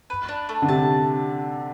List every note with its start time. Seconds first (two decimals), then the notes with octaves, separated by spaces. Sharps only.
0.10 B4
0.28 D4
0.49 A3
0.62 D3
0.68 C3 A5